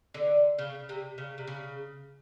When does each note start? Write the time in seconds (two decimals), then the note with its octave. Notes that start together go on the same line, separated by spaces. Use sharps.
0.14 D3
0.58 C#3
0.89 C3
1.18 C#3
1.38 C3
1.47 C#3